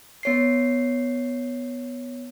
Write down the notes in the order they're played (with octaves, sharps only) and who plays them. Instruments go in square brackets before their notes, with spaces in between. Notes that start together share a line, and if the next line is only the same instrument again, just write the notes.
[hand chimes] B3 C#5 C7